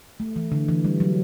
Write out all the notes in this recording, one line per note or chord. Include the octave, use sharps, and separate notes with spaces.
A3
E3
D3
E3
G3
F#3